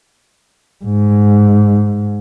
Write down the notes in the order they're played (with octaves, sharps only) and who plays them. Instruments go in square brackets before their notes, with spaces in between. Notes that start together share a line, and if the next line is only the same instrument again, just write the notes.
[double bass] G#2